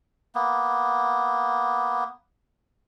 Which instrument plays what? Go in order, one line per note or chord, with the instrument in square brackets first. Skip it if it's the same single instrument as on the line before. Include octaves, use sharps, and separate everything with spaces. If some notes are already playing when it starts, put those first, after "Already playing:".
[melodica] A#3 B3